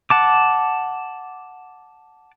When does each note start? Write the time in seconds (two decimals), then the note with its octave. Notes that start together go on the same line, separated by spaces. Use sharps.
0.10 F#5 A5 D6